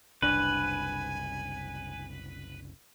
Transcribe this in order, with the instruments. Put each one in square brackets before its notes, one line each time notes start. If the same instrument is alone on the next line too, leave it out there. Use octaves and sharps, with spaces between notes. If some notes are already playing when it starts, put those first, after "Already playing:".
[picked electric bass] F#1 C2 [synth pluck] D4 F#6 [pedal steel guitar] B4 [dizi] G#5